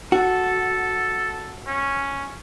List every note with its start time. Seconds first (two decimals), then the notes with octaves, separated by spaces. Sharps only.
0.12 F#4 A4
1.67 C#4